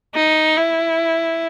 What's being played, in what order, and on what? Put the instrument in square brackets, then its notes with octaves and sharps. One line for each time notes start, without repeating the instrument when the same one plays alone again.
[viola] D#4
E4